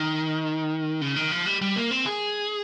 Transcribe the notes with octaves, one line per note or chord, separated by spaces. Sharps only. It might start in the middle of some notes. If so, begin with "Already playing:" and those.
Already playing: D#3
C#3
D#3
F3
G3
G3
A#3
C4
G#4